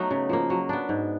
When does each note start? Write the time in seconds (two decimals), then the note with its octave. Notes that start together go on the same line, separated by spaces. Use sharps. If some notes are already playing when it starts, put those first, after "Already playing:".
Already playing: F#3 A3 B3 D#4
0.11 C#3
0.29 F3 A#3
0.50 F#3
0.69 B3 D4
0.89 G#2